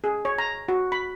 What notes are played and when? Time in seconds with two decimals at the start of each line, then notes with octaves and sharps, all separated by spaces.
0.04 G#4
0.25 C#5
0.38 A#5
0.68 F#4
0.92 B5